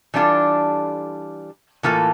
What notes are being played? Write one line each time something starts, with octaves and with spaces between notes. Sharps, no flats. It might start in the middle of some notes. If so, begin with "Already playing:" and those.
E3 G3 D4 F4 A4
A2 E3 A#3 F4 A4